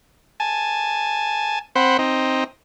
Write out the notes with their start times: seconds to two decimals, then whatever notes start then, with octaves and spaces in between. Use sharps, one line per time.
0.40 G#5 A5
1.75 C4 C5 F#5 B5
1.99 C4 D#4